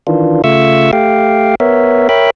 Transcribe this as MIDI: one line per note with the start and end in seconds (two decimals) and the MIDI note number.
0.07 0.42 51
0.07 0.42 52
0.07 0.42 62
0.07 0.42 65
0.44 0.91 49
0.44 0.91 57
0.44 0.91 65
0.44 0.91 76
0.44 0.91 85
0.44 0.91 88
0.93 1.55 57
0.93 1.55 67
0.93 1.55 77
0.93 1.55 79
1.60 2.09 59
1.60 2.09 70
1.60 2.09 73
1.60 2.09 76
2.09 2.30 70
2.09 2.30 73
2.09 2.30 76
2.09 2.30 79
2.09 2.30 83